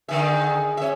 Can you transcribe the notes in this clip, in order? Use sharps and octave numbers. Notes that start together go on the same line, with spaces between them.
D3 D#3 G#4 E5
C#4 E5